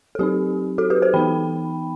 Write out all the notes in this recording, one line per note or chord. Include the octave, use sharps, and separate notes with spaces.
A4
F#3 C4 D#4 G4
F#4 A4
G4 B4
A4 C5
E3 B3 D#4 G5 B5